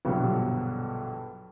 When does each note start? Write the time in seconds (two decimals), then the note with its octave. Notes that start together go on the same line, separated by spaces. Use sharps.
0.05 A#1 G2 B2 D3 F#3